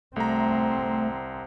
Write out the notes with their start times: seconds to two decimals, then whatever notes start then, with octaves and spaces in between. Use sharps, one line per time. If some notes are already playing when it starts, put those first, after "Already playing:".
0.16 C2 A3 C4 A#5